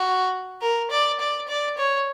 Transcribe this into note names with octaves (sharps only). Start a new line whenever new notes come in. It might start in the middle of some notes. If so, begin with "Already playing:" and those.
Already playing: F#4
A#4
D5
D5
D5
C#5